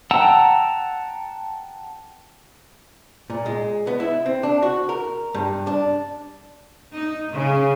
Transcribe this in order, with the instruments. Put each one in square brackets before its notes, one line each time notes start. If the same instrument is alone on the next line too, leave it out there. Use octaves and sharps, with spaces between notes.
[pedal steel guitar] F#5 G5 A5 A#5 E6
[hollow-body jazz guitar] A#2
G#3
B3
E4
C4
D4
F#4
A#4
G2
D4
[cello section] D#4
C#3